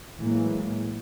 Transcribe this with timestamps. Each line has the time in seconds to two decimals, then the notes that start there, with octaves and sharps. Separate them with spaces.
0.19 A2 E3 F#3 G#3 A#3